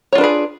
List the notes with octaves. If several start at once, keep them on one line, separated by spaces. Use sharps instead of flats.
D4 F4 G#4 B4 C#5